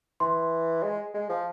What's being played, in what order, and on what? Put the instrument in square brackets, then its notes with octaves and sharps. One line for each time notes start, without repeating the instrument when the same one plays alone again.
[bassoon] E3 [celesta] C6
[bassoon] G#3
G#3
F3